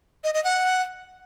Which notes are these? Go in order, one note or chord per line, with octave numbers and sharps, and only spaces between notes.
D#5
D#5
F#5